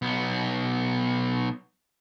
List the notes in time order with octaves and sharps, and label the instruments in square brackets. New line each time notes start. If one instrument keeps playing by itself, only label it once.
[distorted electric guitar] B1 B3